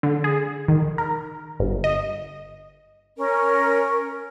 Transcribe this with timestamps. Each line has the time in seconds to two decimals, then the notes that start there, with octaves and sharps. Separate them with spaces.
0.03 D3
0.24 G#4
0.68 D#3
0.98 A#4
1.60 G1
1.84 D#5
3.17 C#4 A#4